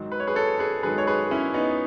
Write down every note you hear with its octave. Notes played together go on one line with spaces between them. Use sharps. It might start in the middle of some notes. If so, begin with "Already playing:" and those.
Already playing: G#2 D#3 F#3
B4
C#5
G#4 B4
A4 C#5
G#4 B4
G#2 D#3 F#3 G#4 B4
C#5
G#4 B4
C#4 E4
B3 D#4